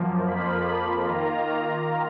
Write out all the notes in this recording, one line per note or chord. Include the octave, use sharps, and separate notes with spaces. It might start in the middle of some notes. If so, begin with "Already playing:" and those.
Already playing: F#2 F3 A#3
F2 F3 A#3 F4 B5
D#3 A#3 F4 A#5